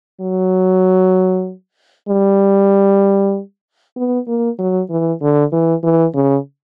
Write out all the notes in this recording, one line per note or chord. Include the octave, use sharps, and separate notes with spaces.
F#3
G3
B3
A#3
F#3
E3
D3
E3
E3
C#3